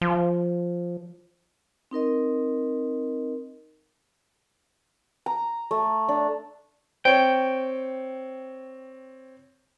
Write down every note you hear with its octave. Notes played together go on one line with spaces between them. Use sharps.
F3
C4 D#4 A#4 D#5
A#5
A3
D4
C4 C#5 G5